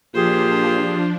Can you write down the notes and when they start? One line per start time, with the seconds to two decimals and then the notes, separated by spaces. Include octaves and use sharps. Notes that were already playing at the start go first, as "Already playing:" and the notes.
0.14 A#2 F3 D4 F4 G4 G#4 C5